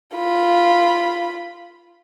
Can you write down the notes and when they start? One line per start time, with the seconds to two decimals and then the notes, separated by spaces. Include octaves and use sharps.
0.16 F4 B5